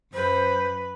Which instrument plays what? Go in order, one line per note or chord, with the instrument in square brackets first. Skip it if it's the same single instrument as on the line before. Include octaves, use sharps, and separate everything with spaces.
[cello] F#2 [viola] B4 [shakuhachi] C5